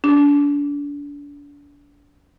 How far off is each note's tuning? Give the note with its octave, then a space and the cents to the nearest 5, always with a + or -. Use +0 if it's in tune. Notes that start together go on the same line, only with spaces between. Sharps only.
D4 -35